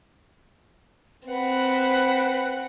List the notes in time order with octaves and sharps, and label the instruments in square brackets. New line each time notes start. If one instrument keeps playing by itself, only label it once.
[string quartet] C4 F#5 [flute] B4